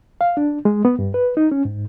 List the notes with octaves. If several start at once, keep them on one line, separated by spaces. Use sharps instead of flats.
F5
D4
G#3
B3
G2
B4
D#4
C#4
G#2